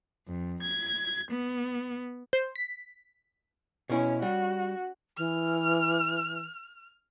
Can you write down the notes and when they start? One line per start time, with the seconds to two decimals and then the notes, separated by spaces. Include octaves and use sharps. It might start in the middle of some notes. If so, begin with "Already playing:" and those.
0.27 F2
0.62 G#6
1.31 B3
2.33 C5
2.56 B6
3.90 B2 C#4 E4
4.22 G3 F#4
5.17 E3 F6